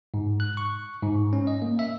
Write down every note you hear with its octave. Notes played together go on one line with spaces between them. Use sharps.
G#2
F#6
C#6
G#2
C#4
D#5
A#3
E5